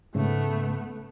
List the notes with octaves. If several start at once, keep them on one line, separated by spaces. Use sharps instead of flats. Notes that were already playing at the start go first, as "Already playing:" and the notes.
G#2 C#3 A3 B3